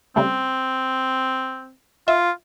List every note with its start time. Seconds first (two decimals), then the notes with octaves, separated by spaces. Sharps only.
0.16 C#3 G3 A3 C4
2.08 F4 E5